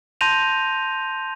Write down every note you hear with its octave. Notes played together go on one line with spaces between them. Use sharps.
A5 C6 G6 A#6 D#7 F7